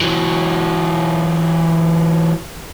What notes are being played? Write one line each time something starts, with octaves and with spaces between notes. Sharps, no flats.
E3 F#3